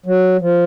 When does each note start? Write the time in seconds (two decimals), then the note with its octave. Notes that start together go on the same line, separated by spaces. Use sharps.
0.06 F#3
0.41 F3